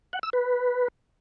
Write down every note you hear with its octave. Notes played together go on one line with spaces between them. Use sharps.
F#5
E6
B4